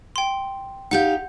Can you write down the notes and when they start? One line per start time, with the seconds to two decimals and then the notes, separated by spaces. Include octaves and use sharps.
0.16 G5 C6
0.91 D#4 G4 F5 F#5 G6